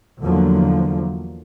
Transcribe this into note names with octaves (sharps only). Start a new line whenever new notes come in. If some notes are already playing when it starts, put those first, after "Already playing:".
E2 D3 F3 F#3 A#3